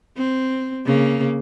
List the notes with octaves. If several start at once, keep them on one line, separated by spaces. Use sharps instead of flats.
C4
C#3 A#3